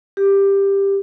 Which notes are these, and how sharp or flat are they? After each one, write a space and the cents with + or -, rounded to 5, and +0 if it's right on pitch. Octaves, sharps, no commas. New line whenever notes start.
G4 +10